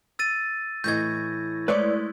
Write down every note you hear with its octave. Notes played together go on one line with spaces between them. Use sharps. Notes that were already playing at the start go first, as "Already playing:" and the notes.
E6 A6 D#7
A2 E3 D#5 C#6 G6 G#6 A#6
G#3 A3 E4 B4 C#5 D5